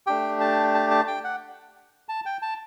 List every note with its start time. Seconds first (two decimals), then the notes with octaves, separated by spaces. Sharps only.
0.07 A3 D4 G4 G5
0.41 A5
0.74 A5
0.91 A5
1.07 G5
1.24 F#5
2.09 A5
2.26 G5
2.42 A5